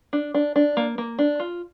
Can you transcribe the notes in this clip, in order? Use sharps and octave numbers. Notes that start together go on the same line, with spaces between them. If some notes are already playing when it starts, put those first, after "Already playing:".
D4
D4
D4
A#3
A#3
D4
F4